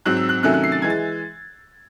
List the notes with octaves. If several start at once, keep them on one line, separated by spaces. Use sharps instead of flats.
G#2 F#3 C4 F#6
E6
F#6
C3 D#3 F#3 A3 C#4 F#6
F#6
C7
A6
E3 G#3 G#6
A6